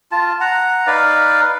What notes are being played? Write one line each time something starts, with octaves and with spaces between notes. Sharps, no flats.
F4 A5
F#5 A#5
D#4 B4 D5 F5